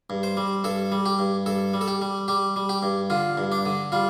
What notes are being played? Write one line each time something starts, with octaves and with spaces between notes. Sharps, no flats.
G2
C5
G3
G2 A4
G3
G4
G2
G2 A4
G3
A4
G4
G3
G3 G4
G3
G4
G2
D3 F4
G2
D4
D3
G3 F4